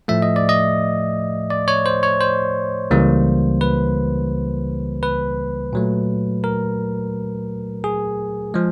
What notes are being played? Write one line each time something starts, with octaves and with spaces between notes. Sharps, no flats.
A2 F3 A3 E5
D#5
D5
D#5
D5
C#5
C5
C#5
C5
C#2 C#3 E3 G3 A#3
B4
B4
A#2 F#3 A3
A#4
G#4
F3 G#3